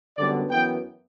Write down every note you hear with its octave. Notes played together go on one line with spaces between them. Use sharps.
F#2 D3 G3 B3 D5
F#2 E3 B3 G5